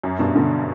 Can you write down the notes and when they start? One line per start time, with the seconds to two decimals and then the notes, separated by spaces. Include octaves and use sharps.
0.03 F#2
0.19 G2 B2
0.35 B2 D3